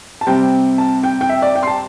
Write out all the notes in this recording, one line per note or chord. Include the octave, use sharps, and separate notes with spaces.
A5
C3 G3 C4 G5
A5
G5
G5
E5
D5
G5
C6
A5